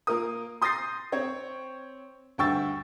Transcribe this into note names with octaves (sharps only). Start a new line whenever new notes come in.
A#3 F4 A#4 D#6
C6 D#6 G6 A6 A#6 C7
C4 C#5 G#6
D2 G2 G5 C#6 E6 A6